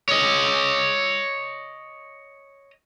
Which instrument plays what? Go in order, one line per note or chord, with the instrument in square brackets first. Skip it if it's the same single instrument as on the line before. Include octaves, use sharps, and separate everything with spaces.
[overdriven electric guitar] C#5 D#5